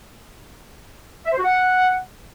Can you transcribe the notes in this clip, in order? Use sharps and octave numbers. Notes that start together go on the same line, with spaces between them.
E5
C5
F#4
F#5